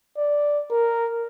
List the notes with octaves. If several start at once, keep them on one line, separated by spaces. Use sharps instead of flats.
D5
A#4